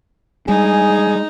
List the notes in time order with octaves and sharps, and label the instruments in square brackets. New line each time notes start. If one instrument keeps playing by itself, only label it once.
[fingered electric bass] G3 G#3 D4 [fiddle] D#4 [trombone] G#4 [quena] G#5